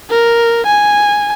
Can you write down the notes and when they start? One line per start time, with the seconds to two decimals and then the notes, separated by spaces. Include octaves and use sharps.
0.10 A#4
0.67 G#5